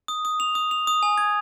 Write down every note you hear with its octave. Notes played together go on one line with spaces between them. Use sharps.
D#6
D#6
F7
D#6
F7
D#6
G#5
G#6